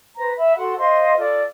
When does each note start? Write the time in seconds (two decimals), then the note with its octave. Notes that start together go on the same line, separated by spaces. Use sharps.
0.17 B4 C5 A#5
0.36 E5 B5
0.56 F#4 A4 F#5 C6
0.77 C5 D#5 F5 C6
1.18 F4 A4 D5